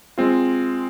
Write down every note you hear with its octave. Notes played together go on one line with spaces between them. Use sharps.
G#3 C4 F4